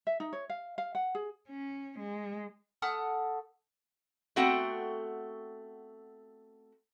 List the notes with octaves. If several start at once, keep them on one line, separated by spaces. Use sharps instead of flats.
E5
D#4
C#5
F5
F5
F#5
G#4
C#4
G#3
A3 F#5 D#6 F6
A3 B3 C4 F#4 F#5 G5